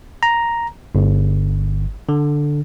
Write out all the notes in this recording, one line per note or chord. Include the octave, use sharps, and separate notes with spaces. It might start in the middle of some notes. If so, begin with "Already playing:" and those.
A#5
G1
D3